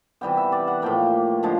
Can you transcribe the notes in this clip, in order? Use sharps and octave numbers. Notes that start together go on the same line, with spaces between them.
C3 E3 G3 B3 G5
E5
D5
F#5
A2 F3 A#3 G5
D3 F3 G#3